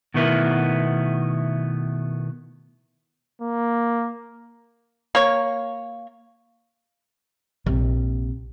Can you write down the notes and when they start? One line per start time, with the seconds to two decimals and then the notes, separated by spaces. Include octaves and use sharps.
0.14 B2 D#3 A3 B3 E4 A#4
3.42 A#3
5.15 A#3 C#5
7.66 A#1 C3